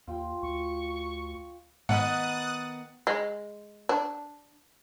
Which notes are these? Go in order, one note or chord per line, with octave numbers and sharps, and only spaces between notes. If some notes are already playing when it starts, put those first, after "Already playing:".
D#2 F4 G5
D2 C#6
G#2 D#3 B3 D#4 F#5 D#6 F#6 A6
G#3
D4